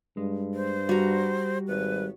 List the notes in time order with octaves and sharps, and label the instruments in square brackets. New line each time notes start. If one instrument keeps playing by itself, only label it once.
[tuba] G2 [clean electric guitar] G#3
[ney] C5
[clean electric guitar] G3 [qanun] F#4 A#5
[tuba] G#1 [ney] B4